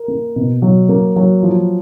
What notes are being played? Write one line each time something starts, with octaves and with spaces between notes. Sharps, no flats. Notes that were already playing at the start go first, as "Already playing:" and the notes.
Already playing: A#4
A#3
B2
F#3
A#3
F#3
F3